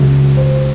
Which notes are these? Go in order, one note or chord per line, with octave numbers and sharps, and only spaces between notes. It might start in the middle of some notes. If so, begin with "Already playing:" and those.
Already playing: C#2 C#3 F#3
C5